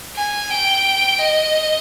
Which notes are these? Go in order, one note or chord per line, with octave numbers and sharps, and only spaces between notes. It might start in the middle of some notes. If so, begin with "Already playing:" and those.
G#5
G5
D#5